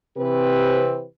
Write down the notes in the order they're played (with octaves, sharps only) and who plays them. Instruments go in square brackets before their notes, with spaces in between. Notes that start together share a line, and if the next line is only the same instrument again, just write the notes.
[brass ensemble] C3 E3 C4 G4 B4